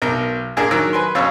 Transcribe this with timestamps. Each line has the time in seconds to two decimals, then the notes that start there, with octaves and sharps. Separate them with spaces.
0.02 B1 A#4
0.57 A#2 D4 G#4 A#4
0.71 D#3 F#3 A#4 E6
0.93 B4 G#5 C6
1.15 F2 B2 C#4 C#5 F5 E6